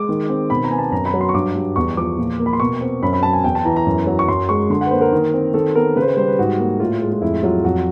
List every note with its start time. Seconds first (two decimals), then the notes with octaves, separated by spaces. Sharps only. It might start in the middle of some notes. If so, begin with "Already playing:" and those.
Already playing: G#3 D6
0.09 D#3
0.29 C4
0.50 B2 B5
0.64 A#5
0.71 B3 G#5
0.78 A5
0.92 F#2 A#5
1.06 B5
1.14 F#3
1.21 C6
1.29 C#6
1.34 G2 D6
1.55 G3
1.76 E2 C#6
1.97 F3 D6
2.18 A#2
2.39 A#3
2.46 B5
2.53 C6
2.60 B2 C#6
2.81 C4
3.03 F#2 B5
3.13 B5
3.23 F#3 A5
3.33 G#5
3.44 E2 G5
3.55 A5
3.65 E3 A#5
3.76 A#5
3.87 F#2
4.07 F#3
4.19 C#6
4.28 F#2 C6
4.49 G#3 C#6
4.70 D3 C6
4.81 F#5
4.86 B4
4.91 A#3 C5
5.01 A#4
5.12 D#3
5.34 C4
5.54 D#3 A4
5.75 B3 A#4
5.96 C#3 B4
6.02 C5
6.07 B4
6.17 G3 C5
6.28 B4
6.39 G#2 F#4
6.59 A#3
6.80 A2 F4
7.02 G#3
7.12 F4
7.22 F2 E4
7.43 F#3 F4
7.64 F2 F#4